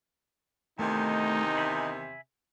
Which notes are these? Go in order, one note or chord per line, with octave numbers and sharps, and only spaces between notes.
E2 C3 D#3 A3 D#4
E5 G#5 B5